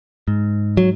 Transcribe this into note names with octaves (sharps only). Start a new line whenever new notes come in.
G#2
F#3